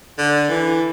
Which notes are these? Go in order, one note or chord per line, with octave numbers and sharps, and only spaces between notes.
D3
E3